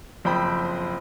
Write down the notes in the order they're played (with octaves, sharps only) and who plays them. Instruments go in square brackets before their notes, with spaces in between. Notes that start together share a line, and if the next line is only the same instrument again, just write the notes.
[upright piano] F#1 F2 C5 G5 B5